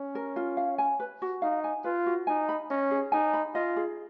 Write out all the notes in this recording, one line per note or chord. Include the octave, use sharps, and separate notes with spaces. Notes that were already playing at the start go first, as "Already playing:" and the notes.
Already playing: C#4
A#4
F4
F5
G#5
B4
F#4
D#4 F5
G#5
F4 B4
F#4
D#4 G#5
B5
C#4 D#5
G#4
D#4 G#5
B5
F4 D#5
G#4